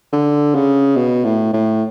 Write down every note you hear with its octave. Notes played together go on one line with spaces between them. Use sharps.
D3
C#3
B2
A2
A2